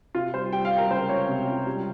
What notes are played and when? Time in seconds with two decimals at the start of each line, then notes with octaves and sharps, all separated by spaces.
0.15 C3 F4
0.34 G3 C5
0.53 G3 G5
0.65 F5
0.71 G3
0.78 A#4
0.91 C#2 C5
1.09 C#2 C#5
1.29 C3
1.48 C#2
1.67 G3